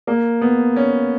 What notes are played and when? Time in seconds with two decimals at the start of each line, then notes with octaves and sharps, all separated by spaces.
0.07 A#3
0.41 B3
0.76 C#4